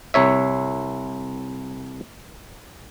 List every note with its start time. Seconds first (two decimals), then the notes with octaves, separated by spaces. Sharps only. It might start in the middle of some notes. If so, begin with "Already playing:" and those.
0.14 C2 C#5 E5